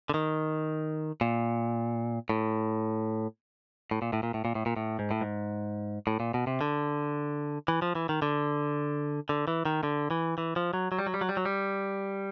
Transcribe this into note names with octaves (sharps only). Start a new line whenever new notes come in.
D3
D#3
A#2
A2
A2
A#2
A2
A#2
A2
A#2
A2
A#2
A2
G#2
A2
G#2
A2
A#2
B2
C3
D3
E3
F3
E3
D#3
D3
D3
E3
D#3
D3
E3
E3
F3
F#3
F#3
G3
F#3
G3
F#3
G3
F#3
G3